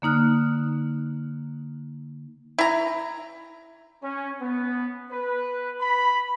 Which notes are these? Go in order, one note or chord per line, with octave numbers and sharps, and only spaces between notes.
D3 A#3 D#4 F6 F#6
E4 A#5
C#4
B3
B4
B5